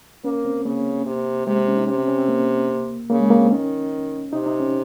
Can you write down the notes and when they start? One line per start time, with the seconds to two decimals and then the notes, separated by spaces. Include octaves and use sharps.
0.24 A#3 C#4
0.45 C4
0.65 C#3 A#3
1.06 C3
1.47 C3 G#3
1.57 C4
1.67 C#4
1.77 D#4
1.88 C3 C#4
1.98 C4
2.08 C#4
2.18 C4
2.28 A#3
3.10 C#3 A#3
3.20 G#3
3.30 A#3
3.41 C4
3.51 D#3 C#4
4.33 C3 D#4
4.46 D#4
4.60 C#4